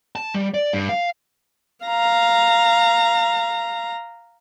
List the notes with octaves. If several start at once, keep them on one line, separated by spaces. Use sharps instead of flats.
A5
G3
D5
G2
F5
F5 A#5